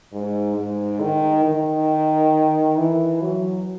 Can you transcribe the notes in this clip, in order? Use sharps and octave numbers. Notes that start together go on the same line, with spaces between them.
G#2
G#2
D#3
D#3
E3
F#3